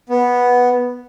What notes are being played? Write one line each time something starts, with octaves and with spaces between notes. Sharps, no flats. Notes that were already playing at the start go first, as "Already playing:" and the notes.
B3